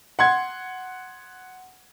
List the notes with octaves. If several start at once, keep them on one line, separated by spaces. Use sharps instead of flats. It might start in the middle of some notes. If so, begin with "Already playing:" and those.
F#5 C6 G#6